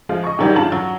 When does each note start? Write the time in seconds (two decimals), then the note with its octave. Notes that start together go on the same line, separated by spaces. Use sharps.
0.09 F3 G#3 F4
0.24 D#5 C#6
0.39 G#2 D#3 F#3 G3 G4
0.56 G2 F4 A5 F#7
0.72 F#3